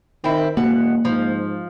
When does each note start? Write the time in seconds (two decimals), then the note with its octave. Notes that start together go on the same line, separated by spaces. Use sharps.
0.24 D#3 C4 E4
0.57 E1 B2 A#3 F#5
1.05 G#2 F3